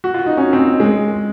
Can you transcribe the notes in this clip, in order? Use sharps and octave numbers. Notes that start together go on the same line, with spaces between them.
F#4
F4
D#4
C#4
C4
G#3